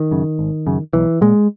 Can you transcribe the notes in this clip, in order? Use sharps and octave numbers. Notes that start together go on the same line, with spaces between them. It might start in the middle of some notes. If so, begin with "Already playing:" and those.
Already playing: D#3
F#2 C#3
G#1
F#2 C#3
B1 E3
A#2 G#3